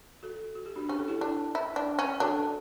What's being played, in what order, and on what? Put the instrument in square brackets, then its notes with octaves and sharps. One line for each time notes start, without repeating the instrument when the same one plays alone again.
[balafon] F#4 A4
F#4
G4
D4 F#4
[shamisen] C#4 [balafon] G4
[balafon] A4
E4 G4
[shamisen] D4
E4
D4
C#4
[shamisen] D4 [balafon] F#4 A4